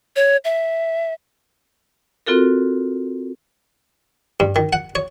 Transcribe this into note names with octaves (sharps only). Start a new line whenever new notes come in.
C#5
E5
C4 F4 F#4 A4 A#4
G2
D#3
F#5
C#5